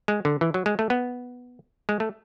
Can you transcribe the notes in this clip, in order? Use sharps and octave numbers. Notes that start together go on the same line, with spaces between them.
G#3
D3
E3
F#3
G#3
A3
B3
G#3
A3